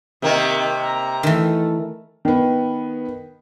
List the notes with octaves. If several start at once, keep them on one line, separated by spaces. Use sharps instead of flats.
C3 D#3 A#3
A#5
D#3 E3 A3
D#3 B3